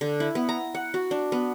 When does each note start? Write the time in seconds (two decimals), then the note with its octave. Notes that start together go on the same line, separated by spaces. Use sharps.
0.01 D3
0.20 E4
0.35 B3
0.49 A#5
0.75 F#5
0.94 F#4
1.11 D4
1.32 B3